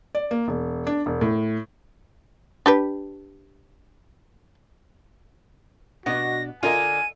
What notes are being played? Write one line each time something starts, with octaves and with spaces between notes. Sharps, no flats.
D5
A#3
E1
D4
E1
A2
D4 G4 B4
B2 B3 D4 F#4 D#5 A#6
D3 F4 A#4 D#5 G#5 D#7